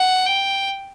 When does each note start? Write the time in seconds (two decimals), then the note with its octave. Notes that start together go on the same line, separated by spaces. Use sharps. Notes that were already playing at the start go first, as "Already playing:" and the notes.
Already playing: F#5
0.26 G5